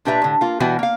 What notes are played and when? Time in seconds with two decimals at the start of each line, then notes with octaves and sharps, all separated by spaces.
0.05 A#2 D4 G4 B4 E5 A#5
0.22 A2 D3
0.41 A#3 F4
0.60 B2 E3 G3 B3 F#4 G5
0.79 A#3 F5